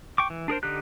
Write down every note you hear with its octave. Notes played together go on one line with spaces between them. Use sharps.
G5 C#6 D6
E3
D4 G#4 A#4 C5
D3 D#4 G4 F#6